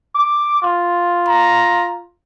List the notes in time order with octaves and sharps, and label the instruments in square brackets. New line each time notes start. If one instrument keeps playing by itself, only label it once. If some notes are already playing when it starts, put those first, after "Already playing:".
[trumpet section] D6
F4
[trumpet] A#5